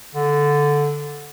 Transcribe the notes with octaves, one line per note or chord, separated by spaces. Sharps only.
D3